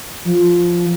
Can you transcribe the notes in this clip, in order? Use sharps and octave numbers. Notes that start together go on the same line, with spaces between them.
F3